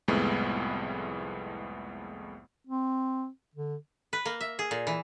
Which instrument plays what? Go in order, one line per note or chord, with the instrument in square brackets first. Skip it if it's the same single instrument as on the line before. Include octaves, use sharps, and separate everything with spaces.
[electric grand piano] C2 F2 A2 G#3 B3
[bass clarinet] C4
D3
[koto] B4
A#3
E5
G#4
A#2
E3